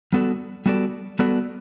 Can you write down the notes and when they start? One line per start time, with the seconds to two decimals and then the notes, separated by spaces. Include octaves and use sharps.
0.13 G3 B3 F#4 A4 D5
0.66 G3 B3 F#4 A4 D5
1.19 G3 B3 F#4 A4 D5